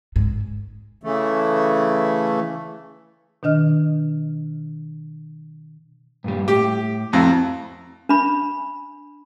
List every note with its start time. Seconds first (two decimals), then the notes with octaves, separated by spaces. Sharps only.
0.16 G#2
1.04 C#3 E3 A3
3.43 B2 D#3 D4 D#5 F6
6.24 G2 A#2 G3
6.48 A2 G4
7.13 F2 A3 E4 F#4
8.09 D4 B5